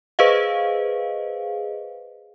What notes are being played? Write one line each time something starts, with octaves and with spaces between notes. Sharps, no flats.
G#4 B4 C5 D#5 F5